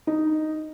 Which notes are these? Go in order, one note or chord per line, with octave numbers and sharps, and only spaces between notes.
D#4